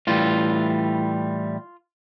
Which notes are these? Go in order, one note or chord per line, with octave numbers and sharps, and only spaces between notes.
A2 E3 G3 F4